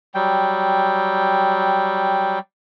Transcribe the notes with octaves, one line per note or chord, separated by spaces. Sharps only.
F#3 G3 G5